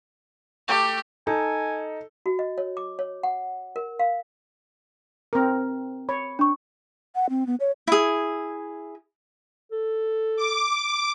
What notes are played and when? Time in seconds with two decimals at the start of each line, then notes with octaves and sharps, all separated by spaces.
0.68 A3 G4 G5 D6
1.27 D#4 A4 G#5
2.26 F#4
2.39 D#5
2.58 C#5
2.77 D6
2.99 C#5
3.23 F#5
3.76 A#4
3.99 F5
5.33 C4 A#4
6.09 C#5 B5
6.39 D4 C#6
7.15 F#5
7.30 C4
7.47 B3
7.60 C#5
7.87 E4 G#4
9.71 A4
10.36 D6